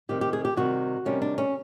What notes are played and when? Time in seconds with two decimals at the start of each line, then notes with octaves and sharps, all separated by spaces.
0.09 C3 D#3 G3 G4
0.21 G4
0.33 G#4
0.45 G4
0.57 C3 D#3 G3 F#4
1.05 C3 D#3 G3 C#4
1.22 D4
1.38 C#4